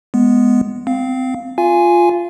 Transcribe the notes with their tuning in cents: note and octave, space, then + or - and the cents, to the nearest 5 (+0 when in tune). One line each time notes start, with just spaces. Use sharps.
G#3 +0 B3 +0
C4 -25 F5 +0
F4 +0 F5 -30 G#5 +0